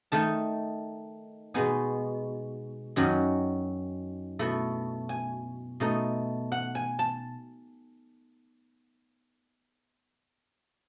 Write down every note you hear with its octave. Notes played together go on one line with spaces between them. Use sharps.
D#3 A3 D#4 A5
B2 G#3 B3 D#4 G#5
F#2 D#3 F#3 C#4 G#5
B2 A3 E4
G#5
B2 A3 D#4
F#5
G#5
A5